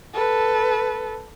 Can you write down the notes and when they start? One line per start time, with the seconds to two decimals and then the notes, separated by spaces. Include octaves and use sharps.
0.14 A4 B4